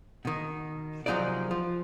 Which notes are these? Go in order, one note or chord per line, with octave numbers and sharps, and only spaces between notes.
B2 D#3
C2 F3 F#3 D#4 G#4 D5
F3